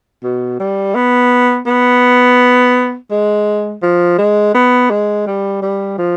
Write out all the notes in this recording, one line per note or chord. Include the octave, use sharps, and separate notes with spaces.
B2
G3
B3
B3
G#3
F3
G#3
B3
G#3
G3
G3
F3